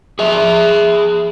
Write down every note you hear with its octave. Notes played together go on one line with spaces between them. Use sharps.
G#4 E5